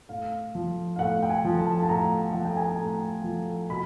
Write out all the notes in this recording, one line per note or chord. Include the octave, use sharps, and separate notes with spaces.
A2 F5
F3
F5
A2 F#5
G5
G#5
F3
A5
A5
A2 A#5
F3 F#5
G5
G#5
A5
A2 A#5
F3
B2 B5